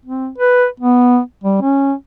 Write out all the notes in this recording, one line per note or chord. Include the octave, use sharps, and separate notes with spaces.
C4
B4
B3
G3
C#4